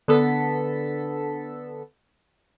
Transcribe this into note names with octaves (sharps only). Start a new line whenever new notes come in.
D3 B3 A4 B6